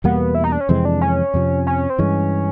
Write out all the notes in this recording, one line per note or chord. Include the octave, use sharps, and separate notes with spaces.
E2 B2 G3 A#3 B3
E4
D#4
D4
C#4
F2 C3 E3 G#3 C4
D4
C#4
F2 C3 F3
C#4
C4
G2 E3 G#3 C#4